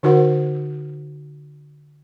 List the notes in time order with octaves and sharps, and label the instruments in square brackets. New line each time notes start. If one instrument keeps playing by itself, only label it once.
[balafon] D3 D#4 F#4 A#4 C5 F#5